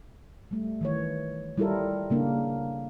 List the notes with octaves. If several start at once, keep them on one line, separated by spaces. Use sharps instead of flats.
G3 A3
D#3 E3 C#5
G3 E4 F4 A4 A#4
C#3 A#3 D4